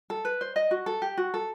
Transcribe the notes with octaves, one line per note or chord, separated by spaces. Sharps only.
A4
B4
C5
D#5
F#4
A4
G4
F#4
A4